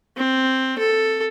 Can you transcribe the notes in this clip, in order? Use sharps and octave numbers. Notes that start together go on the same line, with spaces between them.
C4
A4